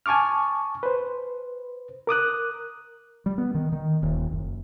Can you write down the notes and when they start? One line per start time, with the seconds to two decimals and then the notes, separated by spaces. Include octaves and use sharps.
0.06 G#5 A5 C#6 D6 F6
0.83 B4 C5
2.07 A#4 D6 D#6 F#6
3.26 G3
3.38 B3
3.55 D#3
3.72 D#3
4.03 D#1
4.32 F#1